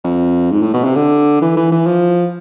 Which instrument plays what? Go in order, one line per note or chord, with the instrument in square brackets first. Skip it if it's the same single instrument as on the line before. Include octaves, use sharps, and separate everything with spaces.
[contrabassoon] F2
G#2
A2
B2
C3
D3
E3
E3
E3
F3